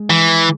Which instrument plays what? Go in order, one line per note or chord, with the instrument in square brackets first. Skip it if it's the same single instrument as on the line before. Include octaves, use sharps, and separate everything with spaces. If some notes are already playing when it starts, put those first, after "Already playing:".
Already playing: [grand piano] G#3
[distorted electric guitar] E3